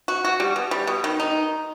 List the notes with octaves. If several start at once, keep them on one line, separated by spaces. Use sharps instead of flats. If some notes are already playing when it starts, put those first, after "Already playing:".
F#4
F#4
G3
B2
G3
B2
D#3
D#4